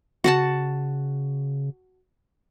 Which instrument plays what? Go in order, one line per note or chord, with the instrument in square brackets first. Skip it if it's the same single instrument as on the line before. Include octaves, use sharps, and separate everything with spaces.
[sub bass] C#3 [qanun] F#4 F#5 A5